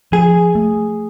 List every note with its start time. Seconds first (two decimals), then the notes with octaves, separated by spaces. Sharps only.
0.12 F3 G#4
0.55 A3